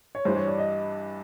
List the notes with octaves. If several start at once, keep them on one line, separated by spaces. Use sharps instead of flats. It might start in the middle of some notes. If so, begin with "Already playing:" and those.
C#5
G2 E3 G3 C5
C#5
D5
D#5